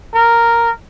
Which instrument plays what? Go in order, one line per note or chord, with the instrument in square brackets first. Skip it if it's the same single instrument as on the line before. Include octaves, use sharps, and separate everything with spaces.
[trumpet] A#4